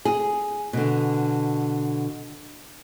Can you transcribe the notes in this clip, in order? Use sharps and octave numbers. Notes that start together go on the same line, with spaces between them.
G#4
B2 D3